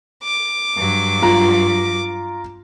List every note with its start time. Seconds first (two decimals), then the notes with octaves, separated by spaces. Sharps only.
0.24 D6
0.76 G2 F#3
1.22 F4 A#5